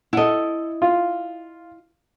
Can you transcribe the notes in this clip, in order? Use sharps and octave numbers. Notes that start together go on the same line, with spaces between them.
E4 A4 D#5 F#5
F4